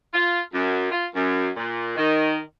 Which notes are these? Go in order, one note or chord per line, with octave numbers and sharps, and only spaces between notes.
F4
F#2
F4
F#2
A#2
D#3